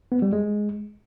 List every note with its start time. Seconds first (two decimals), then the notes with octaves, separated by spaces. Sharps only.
0.12 B3
0.22 G3
0.33 G#3